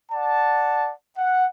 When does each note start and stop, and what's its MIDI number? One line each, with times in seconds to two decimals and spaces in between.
0.12 0.92 74
0.12 0.92 78
0.12 0.92 81
1.18 1.46 78